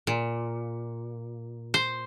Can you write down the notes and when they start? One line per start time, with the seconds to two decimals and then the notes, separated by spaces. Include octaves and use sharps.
0.07 A#2
1.74 C5